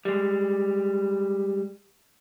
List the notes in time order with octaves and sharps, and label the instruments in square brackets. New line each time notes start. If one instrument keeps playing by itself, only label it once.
[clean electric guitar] G3 G#3